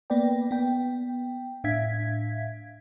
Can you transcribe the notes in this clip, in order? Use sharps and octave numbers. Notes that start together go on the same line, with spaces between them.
A#3 B3 B4 D5 G5
B3 G5
A2 D4 E5 F5 G#6 B6